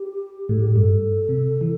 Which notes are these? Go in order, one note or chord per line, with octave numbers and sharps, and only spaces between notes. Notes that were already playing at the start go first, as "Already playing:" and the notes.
Already playing: G4
A2 A4
G4
G2 A4
C3
E3